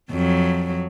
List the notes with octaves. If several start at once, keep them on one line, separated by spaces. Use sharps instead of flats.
F2 F#3